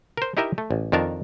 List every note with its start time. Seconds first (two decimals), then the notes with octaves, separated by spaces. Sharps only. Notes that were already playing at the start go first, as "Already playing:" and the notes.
0.17 A#4 C5
0.37 D#4 E4 G4 A#4 D#5 E5
0.58 A3
0.71 A1
0.92 F2 D#3 D4 A#4 A5